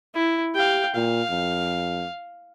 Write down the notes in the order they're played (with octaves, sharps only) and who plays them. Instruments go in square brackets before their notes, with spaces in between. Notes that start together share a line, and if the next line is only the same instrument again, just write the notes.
[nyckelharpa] E4
[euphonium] G4 [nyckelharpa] F5 G5
[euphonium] A#2 [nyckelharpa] F5
[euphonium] F2